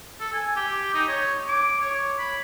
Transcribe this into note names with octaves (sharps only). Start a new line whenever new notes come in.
A4
G#5
G4
D#4
C#5
D6
C#5
B5